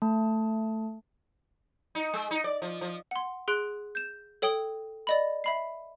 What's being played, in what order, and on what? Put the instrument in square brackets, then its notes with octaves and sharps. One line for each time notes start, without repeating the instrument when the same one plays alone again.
[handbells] A3 A5
[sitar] D#4
G#3
D#4
D5
F3
F3
[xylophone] F#5 C6
G#4 C6 F#6 D7
G6 E7
A4 C#5 G5 D#6 G7
D5 D#5 B5
E5 B5 C7